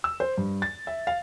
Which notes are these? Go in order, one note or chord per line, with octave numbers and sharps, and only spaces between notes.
E6
C5
G2
A6
E5
F5